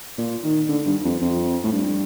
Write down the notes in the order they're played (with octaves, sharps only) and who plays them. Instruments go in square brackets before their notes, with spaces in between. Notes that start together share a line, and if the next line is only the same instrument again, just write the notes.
[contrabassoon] A#2
D#3
D3
G2
F2
F2
A2
G2